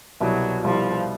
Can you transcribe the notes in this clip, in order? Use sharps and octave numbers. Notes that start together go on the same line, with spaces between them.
C2 B2 F#3 G3
C2 B2 F3 G3